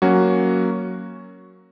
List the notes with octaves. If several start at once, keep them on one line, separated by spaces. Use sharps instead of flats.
F#3 A#3 C#4 F#4